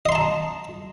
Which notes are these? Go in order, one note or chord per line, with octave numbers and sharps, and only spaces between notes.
D#5 A5 A#5 C6